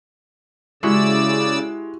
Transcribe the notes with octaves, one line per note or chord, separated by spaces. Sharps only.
C#3 G#3 E4 F#4 G4 D5 E6